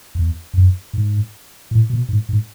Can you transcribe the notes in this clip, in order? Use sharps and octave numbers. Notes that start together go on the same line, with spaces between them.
E2
F#2
G#2
A2
B2
G#2
G#2